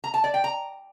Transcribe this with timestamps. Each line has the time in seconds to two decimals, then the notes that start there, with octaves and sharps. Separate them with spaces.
0.04 A#5
0.14 A5
0.24 D5
0.34 G5
0.44 A#5